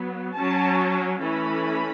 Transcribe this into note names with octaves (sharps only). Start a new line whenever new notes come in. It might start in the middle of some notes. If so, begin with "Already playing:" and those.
Already playing: F#3 B3
F#3 C#4 A5
E3 A3 C#4 B5